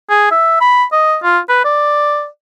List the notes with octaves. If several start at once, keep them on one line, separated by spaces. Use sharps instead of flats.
G#4
E5
B5
D#5
F4
B4
D5